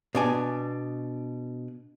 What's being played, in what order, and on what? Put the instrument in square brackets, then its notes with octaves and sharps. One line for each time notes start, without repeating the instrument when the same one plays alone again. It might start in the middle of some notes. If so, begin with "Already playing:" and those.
[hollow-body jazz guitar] B2 D4 G#5